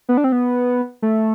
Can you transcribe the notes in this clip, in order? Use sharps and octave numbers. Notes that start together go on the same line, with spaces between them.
B3
D4
C4
B3
A3